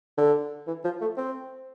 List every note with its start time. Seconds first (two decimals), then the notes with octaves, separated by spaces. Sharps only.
0.18 D3
0.67 E3
0.85 F3
1.01 A3
1.17 C4